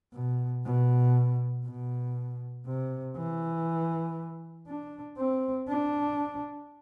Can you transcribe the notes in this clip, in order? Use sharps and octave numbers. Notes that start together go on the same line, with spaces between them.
B2
B2
B2
C3
E3
D4
C4
D4